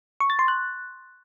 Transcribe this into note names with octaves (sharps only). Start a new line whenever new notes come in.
C#6
A6
C6
F#6